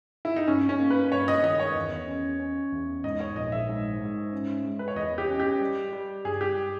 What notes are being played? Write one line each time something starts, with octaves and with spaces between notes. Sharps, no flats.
E4
D#4
G2 C#4
C#4
A#3
B4
G2 C#5
D#5
D#3 D#5
C#5
E2
C#4
C#4
E2
G#2 D#5
C#5
A#1 D#5
E5
G#2
G#2
C#4
G#3
B4
C#5
E2 D#5
G4
C#4
G4
G3
G3
G2 G#4
G4